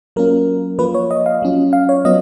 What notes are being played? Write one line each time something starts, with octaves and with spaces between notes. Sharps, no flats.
F#3 A#3 C#4 F4 A#4
F3 A#3 F4 B4
C#5
D#5
F5
F#3 C#4 F4
F5
C#5
F#3 B3 F4 D#5